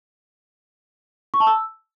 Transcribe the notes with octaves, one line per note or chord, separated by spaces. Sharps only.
C#6
A5
E6